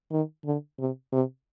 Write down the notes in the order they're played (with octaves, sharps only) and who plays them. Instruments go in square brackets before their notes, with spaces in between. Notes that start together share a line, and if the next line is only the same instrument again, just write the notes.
[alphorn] D#3
D3
C3
C3